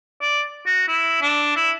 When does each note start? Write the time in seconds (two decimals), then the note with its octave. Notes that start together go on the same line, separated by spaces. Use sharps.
0.21 D5
0.66 F#4
0.88 E4
1.22 D4
1.56 E4